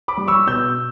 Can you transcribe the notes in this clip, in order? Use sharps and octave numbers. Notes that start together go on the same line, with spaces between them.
B5 D6
G3
C#6 E6
B2 E6 G6